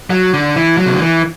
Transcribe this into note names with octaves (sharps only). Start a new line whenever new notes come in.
F#3
D3
E3
F#3
C3
D3
E3